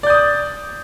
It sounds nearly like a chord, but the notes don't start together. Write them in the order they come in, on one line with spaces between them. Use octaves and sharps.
D5 G6 D#6